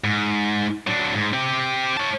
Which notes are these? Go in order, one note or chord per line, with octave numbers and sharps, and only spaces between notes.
G#2
F#3 D4
G#2
C4 G4
C#5 A5